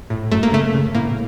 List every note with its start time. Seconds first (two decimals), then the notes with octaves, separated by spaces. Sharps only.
0.10 A2
0.32 F#2 A3
0.43 A#3
0.52 C#3 A3
0.74 C#3
0.95 A2 A#3